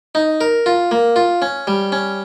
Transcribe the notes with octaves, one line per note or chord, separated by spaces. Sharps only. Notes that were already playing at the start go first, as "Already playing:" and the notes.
D#4
A#4
F4
A#3
F4
C#4
G3
C#4